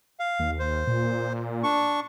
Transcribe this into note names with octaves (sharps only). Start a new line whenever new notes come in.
F5
D#2
C5
A#2
D4 C#6